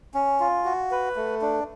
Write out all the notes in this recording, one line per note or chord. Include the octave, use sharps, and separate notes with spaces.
C#4
F4
F#4
B4
A3
D4